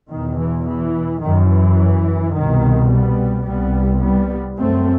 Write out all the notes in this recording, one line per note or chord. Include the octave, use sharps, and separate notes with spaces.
E2 B2 D#3
E3
E3
F#2 D#3
E3
C2 B2 D#3
G3 B3
C2 C3 G3 B3
G3 B3
F#2 A3 C4